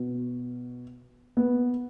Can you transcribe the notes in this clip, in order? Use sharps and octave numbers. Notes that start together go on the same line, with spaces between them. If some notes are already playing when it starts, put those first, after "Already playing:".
Already playing: B2
B3